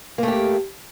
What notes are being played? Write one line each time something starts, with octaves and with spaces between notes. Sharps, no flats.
A3 A#3 G4